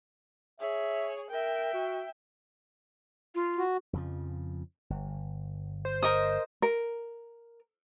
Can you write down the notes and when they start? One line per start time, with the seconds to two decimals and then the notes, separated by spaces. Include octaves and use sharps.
0.60 G#4 C#5 E5
1.30 A#4 E5 G5
1.74 F#4
3.35 F4
3.58 F#4
3.93 F2 C#3 F3
4.90 G1
5.85 C5
6.03 A#4 D#5 D#6
6.62 A#4